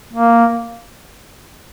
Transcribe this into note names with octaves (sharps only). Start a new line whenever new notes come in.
A#3